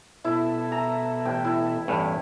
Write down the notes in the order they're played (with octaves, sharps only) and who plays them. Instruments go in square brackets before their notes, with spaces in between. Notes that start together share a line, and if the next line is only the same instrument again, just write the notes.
[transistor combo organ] B2 A4 E5 [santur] E4
[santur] A#5
[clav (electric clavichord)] A1 [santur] G5
[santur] E4
[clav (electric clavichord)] A1 E2 G2 [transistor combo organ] C#4